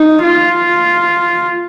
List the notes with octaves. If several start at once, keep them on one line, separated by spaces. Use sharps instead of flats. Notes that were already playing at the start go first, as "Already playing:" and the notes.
Already playing: D#4
F4